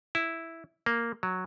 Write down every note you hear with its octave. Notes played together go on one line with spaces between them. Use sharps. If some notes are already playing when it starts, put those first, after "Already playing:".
E4
A#3
F#3